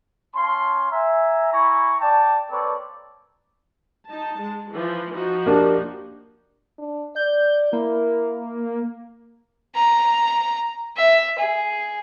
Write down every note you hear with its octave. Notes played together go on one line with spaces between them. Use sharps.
C#4 F5 A5 C6
E5 G#5 A#5
E4 G#5 A#5 B5 C#6
D5 G5 A5
A#3 C4 A4 B4 C#5 D5
D#4 A5
G#3
E3 F3
F3 D#4 F#4
A#3 D4 G4
D4
D5 G6
A#3 E4
A#5
E5
G#4